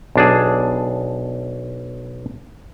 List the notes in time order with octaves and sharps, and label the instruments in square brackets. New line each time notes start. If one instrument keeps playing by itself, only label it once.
[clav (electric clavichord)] B1 D4 G#4